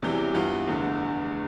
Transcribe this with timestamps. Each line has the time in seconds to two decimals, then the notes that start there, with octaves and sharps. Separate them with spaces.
0.02 E1 E2 C3 E3 G3
0.34 G2 E3 B3 F4
0.67 F1 E2 D3 A3